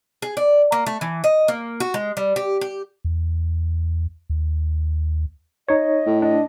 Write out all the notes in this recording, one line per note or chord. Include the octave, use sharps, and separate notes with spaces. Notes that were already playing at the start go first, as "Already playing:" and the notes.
G#4
D5
A#3
A3
E3
D#5
A#3
F#4
G#3
G3
G4
G4
E2
D#2
D#4 C#5 D#5
A2
D4 D#5